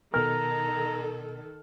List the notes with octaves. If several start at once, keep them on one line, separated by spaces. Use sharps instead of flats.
B2 D#3 A4 A#4 A#5 F6